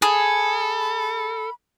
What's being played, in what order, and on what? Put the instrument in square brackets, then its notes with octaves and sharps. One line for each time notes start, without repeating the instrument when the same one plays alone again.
[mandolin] G#4 [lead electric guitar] A4 [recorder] B5